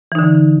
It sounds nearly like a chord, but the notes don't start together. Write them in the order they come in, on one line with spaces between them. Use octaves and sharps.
E3 D#4 D3